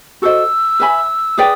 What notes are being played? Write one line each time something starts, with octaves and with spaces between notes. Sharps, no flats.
F#4 A4 C5 D#5 E6
B4 E5 G#5 B5
G#4 B4 D5 G5 D#6